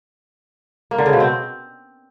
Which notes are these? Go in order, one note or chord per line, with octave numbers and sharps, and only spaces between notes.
A#3
D3
C#3
B2
C4